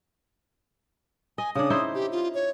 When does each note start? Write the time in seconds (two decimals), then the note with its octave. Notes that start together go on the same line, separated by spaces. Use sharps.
1.38 D#5 G#5
1.55 C#3 D4 D#6
1.70 D#4 E4 C5
1.95 G4
2.12 F4
2.34 C#5